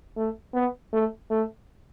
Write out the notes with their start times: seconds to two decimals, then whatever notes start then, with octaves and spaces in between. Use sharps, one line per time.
0.17 A3
0.54 B3
0.93 A3
1.31 A3